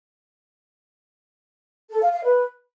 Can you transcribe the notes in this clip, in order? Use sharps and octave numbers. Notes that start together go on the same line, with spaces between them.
A4
F5
F5
B4